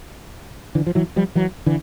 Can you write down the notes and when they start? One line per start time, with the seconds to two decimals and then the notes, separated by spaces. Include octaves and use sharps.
0.75 D3 E3
0.87 F3
0.95 E3 F#3
1.16 F3 G3
1.35 E3 F#3
1.66 D3 E3